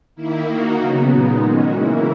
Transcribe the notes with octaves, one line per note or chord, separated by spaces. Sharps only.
D#3 A#3 E4
D#3 A#3 D#4 F#4
C#3 F#3 B3
A#2 G#3 B3 D#4
D#3 G#3 C#4 F#4
C#3 E3 A#3 E4